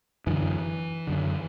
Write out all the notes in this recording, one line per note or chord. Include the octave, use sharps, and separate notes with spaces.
F#2 D3 E3
F#2 D3